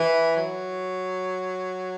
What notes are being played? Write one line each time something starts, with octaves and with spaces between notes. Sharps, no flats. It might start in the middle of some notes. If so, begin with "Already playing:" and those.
Already playing: E3
F#3